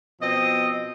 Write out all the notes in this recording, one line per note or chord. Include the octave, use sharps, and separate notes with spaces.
B2 F3 C4 D#5